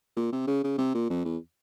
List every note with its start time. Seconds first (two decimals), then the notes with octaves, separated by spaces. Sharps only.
0.17 A#2
0.33 C3
0.47 C#3
0.64 C#3
0.78 C3
0.95 A#2
1.10 F2
1.25 E2